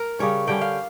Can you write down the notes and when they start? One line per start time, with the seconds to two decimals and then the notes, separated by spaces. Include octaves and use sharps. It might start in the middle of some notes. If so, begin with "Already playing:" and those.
Already playing: A#4
0.19 C#3 G3 C#4 C#5
0.47 D3 G3 C#4 G5
0.61 F5